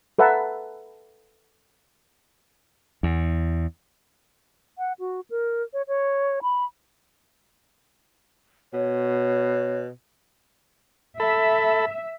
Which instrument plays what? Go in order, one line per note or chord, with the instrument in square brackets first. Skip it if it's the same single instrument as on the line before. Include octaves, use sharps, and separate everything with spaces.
[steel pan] A4 B4 E5 F#5 A5 A#5
[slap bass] E2
[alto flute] F#5
F#4
A#4
C#5
C#5
B5
[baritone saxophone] B2 [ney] C#5
[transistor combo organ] A4 B5 [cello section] E5